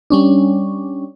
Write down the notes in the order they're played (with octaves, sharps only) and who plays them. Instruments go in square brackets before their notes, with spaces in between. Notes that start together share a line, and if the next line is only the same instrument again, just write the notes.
[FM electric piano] G3 C#4 D4